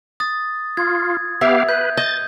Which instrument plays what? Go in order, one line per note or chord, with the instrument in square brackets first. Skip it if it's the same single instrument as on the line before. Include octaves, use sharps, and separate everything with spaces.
[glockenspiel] D#6 A6
[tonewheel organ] F4 [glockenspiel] G#6
[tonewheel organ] B3 G4 F5 [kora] E5
[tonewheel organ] B4 [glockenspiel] G6
[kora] D#5 [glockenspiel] G6 [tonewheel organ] A6